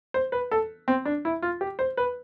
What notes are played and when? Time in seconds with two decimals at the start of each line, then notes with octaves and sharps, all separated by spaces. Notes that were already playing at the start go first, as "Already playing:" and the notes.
0.14 C5
0.32 B4
0.51 A4
0.88 C4
1.05 D4
1.25 E4
1.42 F4
1.61 G4
1.79 C5
1.97 B4